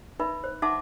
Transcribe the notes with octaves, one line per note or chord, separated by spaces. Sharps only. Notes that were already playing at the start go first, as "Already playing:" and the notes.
D#4 B4 E5 B5
C5
D#4 E5 F#5 A5 C6 D6